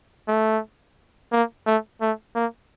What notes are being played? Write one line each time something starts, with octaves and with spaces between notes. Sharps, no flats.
A3
A#3
A3
A3
A#3